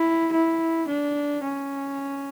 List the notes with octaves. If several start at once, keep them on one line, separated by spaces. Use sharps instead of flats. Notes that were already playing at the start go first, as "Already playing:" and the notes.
Already playing: E4
E4
D4
C#4